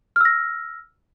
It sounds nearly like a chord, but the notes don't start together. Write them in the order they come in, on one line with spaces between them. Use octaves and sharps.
F6 E6 A#6